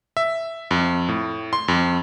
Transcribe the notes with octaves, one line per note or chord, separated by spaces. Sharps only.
E5
F2
A2
C6
F2